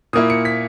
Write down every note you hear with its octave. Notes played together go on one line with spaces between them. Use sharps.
A#2 A#3 E4 D#6
C#7
B6